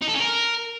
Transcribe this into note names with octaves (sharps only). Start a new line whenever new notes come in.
D#4
A4
C#4
A#4